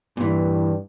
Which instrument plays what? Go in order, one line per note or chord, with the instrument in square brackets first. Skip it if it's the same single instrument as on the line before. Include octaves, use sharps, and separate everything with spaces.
[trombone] G2 [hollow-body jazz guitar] A#2 E3